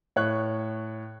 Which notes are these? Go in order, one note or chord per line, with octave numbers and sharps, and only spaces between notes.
A2 C#5 F#6